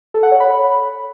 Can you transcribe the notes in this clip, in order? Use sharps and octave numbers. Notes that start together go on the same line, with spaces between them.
A4
F#5
C#5
B5